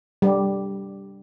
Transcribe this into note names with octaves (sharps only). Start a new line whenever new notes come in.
G3